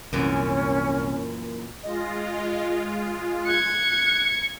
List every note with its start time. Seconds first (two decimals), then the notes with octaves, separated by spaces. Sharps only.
0.13 C2 F#2 A#2 E3 C#4
1.83 G#3 F4 D#5
3.46 F#6 G#6 C#7